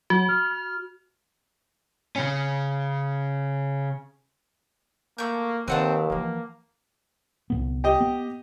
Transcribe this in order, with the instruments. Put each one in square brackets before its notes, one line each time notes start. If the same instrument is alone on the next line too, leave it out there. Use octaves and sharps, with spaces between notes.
[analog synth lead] F#3 [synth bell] F#4
[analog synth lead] F6
[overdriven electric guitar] C#3 C#4
[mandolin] A3 G6 [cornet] A#3
[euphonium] D#2 [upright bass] D#3 [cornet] C4 [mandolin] B4 F#5 A5
[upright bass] E3 F3 [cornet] A#3
[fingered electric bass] C2 F2 B3
[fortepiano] G4 D#5
[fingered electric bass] B3